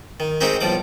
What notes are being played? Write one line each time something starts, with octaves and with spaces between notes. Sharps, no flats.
D#3
G#3 C4 D#4 F#4 G4 A#4
B1 A2 F3 G3 D6